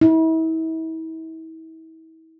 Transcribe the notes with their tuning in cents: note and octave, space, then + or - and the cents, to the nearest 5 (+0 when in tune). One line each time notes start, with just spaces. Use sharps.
E4 -40